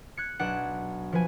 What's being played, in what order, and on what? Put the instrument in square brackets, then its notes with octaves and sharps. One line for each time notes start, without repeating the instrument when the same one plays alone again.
[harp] F#6 G#6 C#7
B1 D4 F#5 E7
F3 B4 G#5